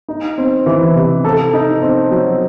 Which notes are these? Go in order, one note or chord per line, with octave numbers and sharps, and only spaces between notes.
D#4
C4
E3
C3
A4
D#4
C4
F#3